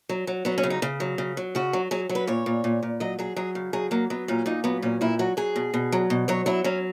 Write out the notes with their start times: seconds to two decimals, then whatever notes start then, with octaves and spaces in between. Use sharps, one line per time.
0.09 F#3
0.27 F#3
0.45 F#3 B3
0.58 C#4
0.63 C#3
0.70 D#4
0.82 C#3
1.00 F#3
1.18 C#3
1.37 F#3
1.55 C#3 F#4
1.73 F#3
1.91 F#3 G#4
2.09 F#3
2.15 B4
2.27 A#2 C#5
2.46 A#2
2.64 A#2
2.83 A#2
3.00 F#3 D#5
3.19 F#3 G#4
3.36 F#3 G#4
3.55 C#3
3.73 F#3 G#4
3.91 F#3 A#3
4.10 F#3 B3
4.28 A#2 C#4
4.46 A#2 D#4
4.64 F#3 B3
4.82 A#2 C#4
5.01 A#2 E4
5.19 F#3 F#4
5.37 F#3 G#4
5.56 B2
5.74 B2
5.92 F#3
6.10 B2
6.28 F#3 C#5
6.46 F#3 E4
6.64 F#3 C#4